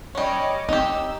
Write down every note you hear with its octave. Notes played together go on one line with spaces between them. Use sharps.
G3 C#4 C#5 D#5 D6
C4 D#4 G4 E6